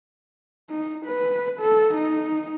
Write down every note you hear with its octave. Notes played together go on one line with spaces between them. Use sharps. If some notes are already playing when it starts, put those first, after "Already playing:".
D#4
B4
A4
D#4